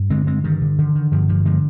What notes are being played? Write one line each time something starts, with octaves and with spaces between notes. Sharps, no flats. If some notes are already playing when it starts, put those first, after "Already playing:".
Already playing: G2
D3 G#3 C4
G#3 C4
G2 D#3
D3
D3 D#3
D#3
G2 D3 F3
D3 F3
D3 F3 G#3